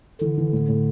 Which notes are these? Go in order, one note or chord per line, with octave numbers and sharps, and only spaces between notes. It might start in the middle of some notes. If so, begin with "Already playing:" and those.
D3 E3
E3
A2
A2